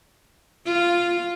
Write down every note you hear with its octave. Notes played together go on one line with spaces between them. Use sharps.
F4